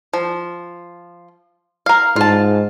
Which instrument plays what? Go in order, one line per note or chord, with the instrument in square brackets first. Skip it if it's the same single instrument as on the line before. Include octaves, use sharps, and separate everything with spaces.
[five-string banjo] F3
A#4 F5
[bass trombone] G#2 [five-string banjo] F4 A5